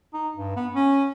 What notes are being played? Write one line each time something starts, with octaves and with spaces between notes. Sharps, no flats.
D#4
G2
B3
C#4